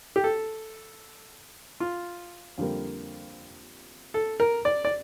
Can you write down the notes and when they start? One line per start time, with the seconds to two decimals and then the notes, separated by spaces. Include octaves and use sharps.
0.16 G4
0.24 A4
1.80 F4
2.58 F2 D3 G3 A#3
4.14 A4
4.40 A#4
4.65 D5
4.85 D5